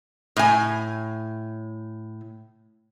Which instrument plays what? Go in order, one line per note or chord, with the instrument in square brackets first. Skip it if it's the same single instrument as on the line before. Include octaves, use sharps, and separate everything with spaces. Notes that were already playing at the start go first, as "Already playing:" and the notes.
[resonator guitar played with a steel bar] A2 G#5